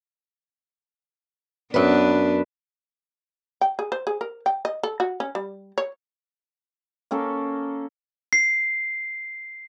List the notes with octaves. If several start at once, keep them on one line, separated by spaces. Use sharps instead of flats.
F#2 B3 D4 B4
G5
G#4
C5
G#4
A#4
G5
D#5
A4
F#4
C#4
G3
C#5
A#3 C#4 A4
C7